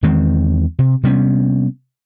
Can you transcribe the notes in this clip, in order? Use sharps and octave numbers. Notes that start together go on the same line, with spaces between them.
E2 D#3 G#3 C4
C3
C3 G3 B3 C#4